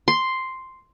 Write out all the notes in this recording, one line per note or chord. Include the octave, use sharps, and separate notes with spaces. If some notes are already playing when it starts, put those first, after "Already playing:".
C6